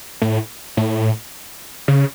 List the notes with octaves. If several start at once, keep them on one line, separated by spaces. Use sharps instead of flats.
A2
A2
C#3